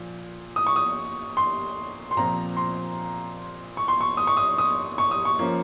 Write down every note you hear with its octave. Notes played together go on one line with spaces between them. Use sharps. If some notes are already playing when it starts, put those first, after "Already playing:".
Already playing: A#2 F3
D#6
C#6
D#6
C6
C6
A#2 F3 C4 A#5
C6
C#6
C6
C#6
D#6
C#6
D#6
D#6
C#6
D#6
C#6
F3 A#3 C#4